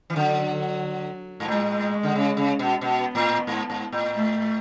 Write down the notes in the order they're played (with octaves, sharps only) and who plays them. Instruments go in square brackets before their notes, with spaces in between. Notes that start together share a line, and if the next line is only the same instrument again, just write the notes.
[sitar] E3
[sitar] D3 [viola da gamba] F#3
[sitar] G#2
[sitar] A2 [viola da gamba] G#3
[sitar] D3
C#3
C#3
B2
[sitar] B2 [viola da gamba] B3
[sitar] A2
G#2
G#2
A2
[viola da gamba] A3